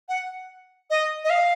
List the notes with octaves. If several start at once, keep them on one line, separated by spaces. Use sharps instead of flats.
F#5
D#5
D#5
F5